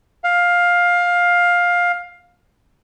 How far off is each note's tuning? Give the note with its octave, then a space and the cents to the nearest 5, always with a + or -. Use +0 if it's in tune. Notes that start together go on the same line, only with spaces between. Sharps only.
F5 +15